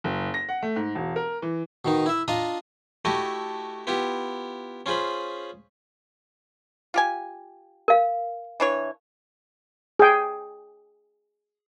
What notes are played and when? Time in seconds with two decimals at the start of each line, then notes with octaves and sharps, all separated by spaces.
0.04 F#1
0.34 A#6
0.49 F#5
0.63 A3
0.76 G#2
0.95 E1
1.16 A#4
1.42 E3
1.85 B2 D#3 D#4
2.06 E4 E5
2.28 D4 F4 D#5 A#5
3.05 A3 E4 F#4 G4 A4 D#5
3.87 B3 E4 F4 G4
4.86 C#4 F4 G#4 C5 B5
6.94 F4 G4 G#5
7.88 A#4 F5
8.60 E3 D4 C#5
9.99 G#4 G5